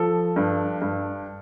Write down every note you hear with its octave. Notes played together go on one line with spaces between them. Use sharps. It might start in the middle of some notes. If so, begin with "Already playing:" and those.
Already playing: F3 A4
G2
G2